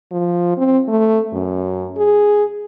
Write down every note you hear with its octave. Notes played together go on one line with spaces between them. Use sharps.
F3
C4
A3
F#2
G#4